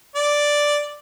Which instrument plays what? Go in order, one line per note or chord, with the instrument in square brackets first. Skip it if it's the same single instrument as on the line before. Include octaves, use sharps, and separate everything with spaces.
[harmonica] D5